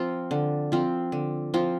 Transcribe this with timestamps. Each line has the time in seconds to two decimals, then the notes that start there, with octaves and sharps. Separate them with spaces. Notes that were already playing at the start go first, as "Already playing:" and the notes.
Already playing: F3 C4 F4
0.31 D3
0.72 F3 C4 F4
1.12 D3
1.54 F3 C4 F4